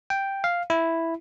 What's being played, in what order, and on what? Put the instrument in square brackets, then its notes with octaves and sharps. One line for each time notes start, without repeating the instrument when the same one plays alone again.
[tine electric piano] G5
F5
E4